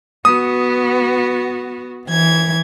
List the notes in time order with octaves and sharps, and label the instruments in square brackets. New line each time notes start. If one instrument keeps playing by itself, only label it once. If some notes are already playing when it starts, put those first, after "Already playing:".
[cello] B3 F#4 [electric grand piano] D#6
[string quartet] E3 G#6